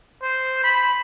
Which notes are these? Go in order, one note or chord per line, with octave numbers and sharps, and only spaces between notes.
C5
B5